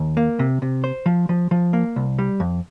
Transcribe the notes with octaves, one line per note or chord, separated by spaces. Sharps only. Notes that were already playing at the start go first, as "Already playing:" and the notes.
Already playing: D#2
A#3
C3
C3
C5
F3
F3
F3
A#3
C2
G3
F2